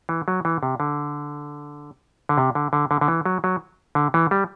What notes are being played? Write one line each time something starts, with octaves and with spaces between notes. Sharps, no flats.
E3
F#3
E3
C3
D3
D3
C3
D3
D3
D3
D3
E3
F#3
F#3
D3
E3
G3